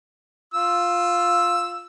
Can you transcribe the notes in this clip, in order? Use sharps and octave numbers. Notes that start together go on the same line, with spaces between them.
F4 E6